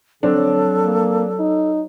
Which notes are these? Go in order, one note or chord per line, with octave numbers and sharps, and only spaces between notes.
D3 F#3 C4 D4 A4
A#3
D#4